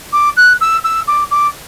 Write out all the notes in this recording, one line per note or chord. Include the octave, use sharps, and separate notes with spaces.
D6
F#6
E6
E6
D6
D6